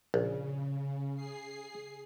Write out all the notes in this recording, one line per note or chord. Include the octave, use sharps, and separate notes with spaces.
A#1 C#3
G#4 C7